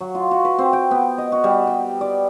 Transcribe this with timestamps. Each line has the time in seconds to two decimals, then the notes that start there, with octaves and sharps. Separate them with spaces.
0.01 F#3
0.15 F4
0.31 F#4
0.45 B4
0.58 C4
0.73 G5
0.91 B3
1.18 D#5
1.32 F#4
1.44 G3
1.67 G5
2.01 D5